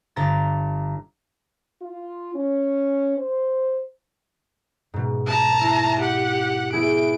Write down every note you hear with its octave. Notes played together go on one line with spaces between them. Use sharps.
G1 A#5 A6
F4
C#4
C5
G#2 B2
A5 A#5
E4
G4 F#5
B3 E4 G#4 D7